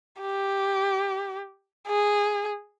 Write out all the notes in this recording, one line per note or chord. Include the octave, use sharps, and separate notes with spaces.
G4
G#4